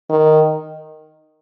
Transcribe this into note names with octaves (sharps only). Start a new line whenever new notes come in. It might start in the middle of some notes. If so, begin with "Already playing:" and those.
D#3